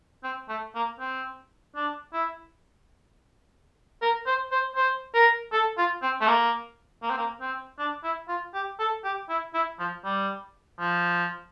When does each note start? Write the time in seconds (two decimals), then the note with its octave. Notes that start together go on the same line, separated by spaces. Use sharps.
0.24 C4
0.49 A3
0.75 A#3
1.00 C4
1.76 D4
2.13 E4
4.02 A#4
4.27 C5
4.52 C5
4.76 C5
5.14 A#4
5.53 A4
5.78 F4
6.03 C4
6.22 A3
6.27 A#3
7.03 A#3
7.11 C4
7.18 A#3
7.41 C4
7.79 D4
8.04 E4
8.29 F4
8.54 G4
8.79 A4
9.04 G4
9.30 E4
9.54 E4
9.79 F3
10.05 G3
10.80 F3